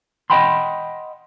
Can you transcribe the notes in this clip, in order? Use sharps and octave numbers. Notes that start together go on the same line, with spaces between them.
D#5 E5 F#5 G5 B5 C6